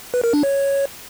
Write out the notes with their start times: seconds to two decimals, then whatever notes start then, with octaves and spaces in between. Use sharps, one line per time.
0.14 B4
0.24 A#4
0.33 D4
0.43 C#5